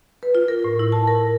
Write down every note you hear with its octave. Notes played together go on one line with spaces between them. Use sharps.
B4
F4
A#4
A2
E4
A5
A#4